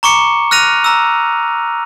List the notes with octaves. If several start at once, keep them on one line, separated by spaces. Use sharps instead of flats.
A#5 C#6 D6 C#7
F6 F#6 A#6 D#7 F7
A#5 E6